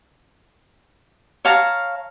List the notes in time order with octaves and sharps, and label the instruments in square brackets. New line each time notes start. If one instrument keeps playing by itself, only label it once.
[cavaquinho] C#5 F5 A5 A#5